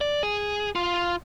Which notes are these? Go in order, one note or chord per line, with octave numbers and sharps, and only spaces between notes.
D5
G#4
F4